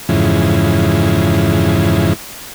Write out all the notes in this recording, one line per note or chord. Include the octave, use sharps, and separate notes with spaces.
F2 G#2 C#3 E3